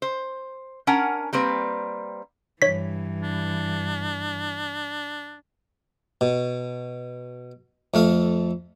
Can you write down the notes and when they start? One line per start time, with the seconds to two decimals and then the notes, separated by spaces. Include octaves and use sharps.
0.02 C5
0.87 C#4 D4 A#4 F#5 G#5 A#5
1.33 G3 A#3 C4 B4
2.62 G2 E3 C#5 B6
3.23 D4
6.21 B2
7.94 F2 A3 F5